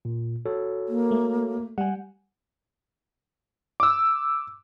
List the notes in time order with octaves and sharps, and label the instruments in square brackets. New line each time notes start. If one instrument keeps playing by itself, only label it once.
[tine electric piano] A#2
F#4 A4 C#5
[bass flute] A#3
[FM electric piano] A3
[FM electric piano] G3 [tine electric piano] F#5 G#5
[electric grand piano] D6 E6